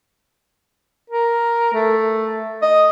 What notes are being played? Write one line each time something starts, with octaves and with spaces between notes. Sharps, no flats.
A#4
A3
D#5